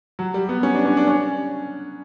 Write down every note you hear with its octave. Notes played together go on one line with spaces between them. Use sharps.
F#3
G3
B3
C#4
D4
C#4
D4
C#4